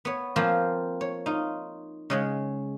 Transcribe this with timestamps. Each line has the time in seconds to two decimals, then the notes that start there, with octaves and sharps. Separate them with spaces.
0.05 B3 C#5
0.36 F3 A#3 C4 F4 C5 G#5
1.01 C#5
1.26 D#4 F4
2.10 C#3 G#3 C#4